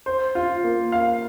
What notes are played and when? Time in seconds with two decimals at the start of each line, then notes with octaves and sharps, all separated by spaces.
0.06 C5
0.35 F4
0.64 A#3
0.92 F5